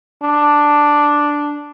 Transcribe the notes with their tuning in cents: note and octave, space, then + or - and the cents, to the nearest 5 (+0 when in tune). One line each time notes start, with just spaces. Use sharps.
D4 +0